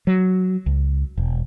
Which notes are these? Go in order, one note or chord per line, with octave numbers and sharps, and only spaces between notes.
F#3
C#2
E1